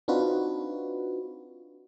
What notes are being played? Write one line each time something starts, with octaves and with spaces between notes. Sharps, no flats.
C4 D4 D#4 F4 F#4 B4